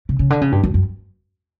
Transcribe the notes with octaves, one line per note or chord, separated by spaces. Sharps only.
C#3
C#3
D3
C#3
G2
F#2
F#2